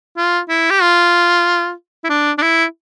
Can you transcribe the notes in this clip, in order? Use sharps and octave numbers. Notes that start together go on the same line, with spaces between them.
F4
E4
G4
F4
E4
D4
D4
E4